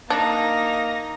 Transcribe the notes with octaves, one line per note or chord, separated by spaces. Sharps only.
A#3 D4 D#4 A#6